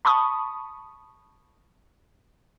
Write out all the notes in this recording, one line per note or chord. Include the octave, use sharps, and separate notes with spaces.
A5 B5 C#6 D#6